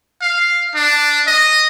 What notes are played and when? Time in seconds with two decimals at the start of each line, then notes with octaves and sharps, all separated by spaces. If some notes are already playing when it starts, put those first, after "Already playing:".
0.22 F5
0.75 D4
1.27 D#5